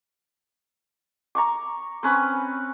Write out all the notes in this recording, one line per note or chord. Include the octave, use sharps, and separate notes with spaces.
A#5 C#6 D6
C4 C#4 B4